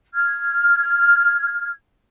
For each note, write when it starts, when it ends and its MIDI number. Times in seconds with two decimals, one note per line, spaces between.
0.14 1.70 89
0.14 1.70 92